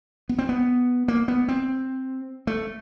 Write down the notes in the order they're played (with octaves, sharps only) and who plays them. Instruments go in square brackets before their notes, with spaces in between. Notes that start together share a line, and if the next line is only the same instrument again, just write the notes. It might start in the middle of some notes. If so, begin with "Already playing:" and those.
[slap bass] B3
C4
B3
A#3
B3
C4
A3